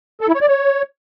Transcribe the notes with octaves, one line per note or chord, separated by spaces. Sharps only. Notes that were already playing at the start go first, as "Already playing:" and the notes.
A4
E4
C#5
D5
C#5